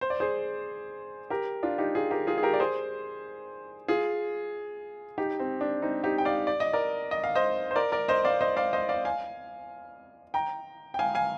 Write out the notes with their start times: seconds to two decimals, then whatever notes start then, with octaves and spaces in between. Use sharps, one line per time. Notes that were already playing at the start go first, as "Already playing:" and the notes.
0.01 C5
0.10 D5
0.20 G#4 C5
1.30 G4 A#4
1.63 D4 F4
1.78 D#4 G4
1.95 F4 G#4
2.11 G4 A#4
2.27 F4 G#4
2.38 G#4
2.43 G4 A#4
2.53 D5
2.60 G#4 C5
3.88 F4 G#4
5.18 D#4 G4
5.39 C4
5.61 D4
5.82 C4 D#4
6.04 D#4 G4
6.18 G5
6.25 D5 F5
6.47 D5
6.60 D#5
6.73 A#4 D5
7.11 D#5
7.24 F5
7.35 C5 D#5
7.71 C5
7.76 A#4 D5
7.92 A#4 D5
8.08 C5 D#5
8.25 D5 F5
8.41 C5 D#5
8.57 D5 F5
8.73 C5 D#5
8.89 D5 F5
9.05 F5 G#5
10.34 G5 A#5
10.94 G5
10.99 F5 G#5
11.15 F5 G#5